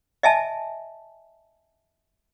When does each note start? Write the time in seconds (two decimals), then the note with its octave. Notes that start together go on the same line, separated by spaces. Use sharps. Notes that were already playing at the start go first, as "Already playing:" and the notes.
0.23 D#5 E5 G#5 A5